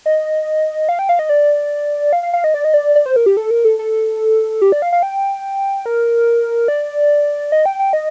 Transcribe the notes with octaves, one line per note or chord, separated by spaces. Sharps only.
D#5
F5
G5
F5
D#5
D5
F5
F5
F5
D#5
D5
D#5
D5
D5
C5
A#4
G4
A4
A#4
A4
A4
G4
D5
F5
F5
G5
A#4
D5
D#5
G5
G5
D#5